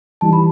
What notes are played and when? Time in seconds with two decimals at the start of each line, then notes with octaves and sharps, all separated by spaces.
0.21 E3 G3 D#4 A5
0.33 B5